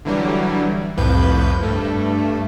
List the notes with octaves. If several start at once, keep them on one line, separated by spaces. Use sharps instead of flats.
D3 E3 F#3 G3
C2 F2 A2 B4 G6
G2 A3